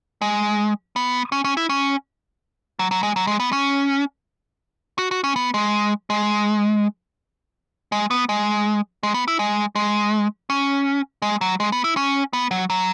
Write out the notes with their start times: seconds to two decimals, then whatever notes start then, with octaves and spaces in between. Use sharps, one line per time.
0.22 G#3
0.96 B3
1.32 C#4
1.44 C#4
1.57 E4
1.69 C#4
2.79 F#3
2.91 F#3
3.03 G#3
3.16 F#3
3.27 G#3
3.40 B3
3.53 C#4
4.98 F#4
5.11 F#4
5.24 C#4
5.36 B3
5.54 G#3
6.10 G#3
7.92 G#3
8.11 B3
8.29 G#3
9.03 G#3
9.14 B3
9.28 E4
9.39 G#3
9.75 G#3
10.50 C#4
11.22 G#3
11.41 F#3
11.60 G#3
11.72 B3
11.84 E4
11.97 C#4
12.33 B3
12.51 F#3
12.70 F#3